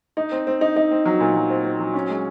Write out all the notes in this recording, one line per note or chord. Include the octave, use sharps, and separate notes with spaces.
D#4
C4
C4
D#4
D#4
C4
F#3
A#2
F#3
C4
C4
F#3
C#4
G#3